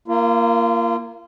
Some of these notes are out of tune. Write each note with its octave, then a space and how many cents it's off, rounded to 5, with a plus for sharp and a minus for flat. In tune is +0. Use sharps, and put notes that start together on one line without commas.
A#3 +0 F4 -35